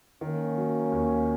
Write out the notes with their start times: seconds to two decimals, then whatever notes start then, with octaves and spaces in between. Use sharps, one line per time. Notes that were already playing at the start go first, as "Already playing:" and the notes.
0.21 D#3 A#3 C#4
0.57 F#3
0.92 D#2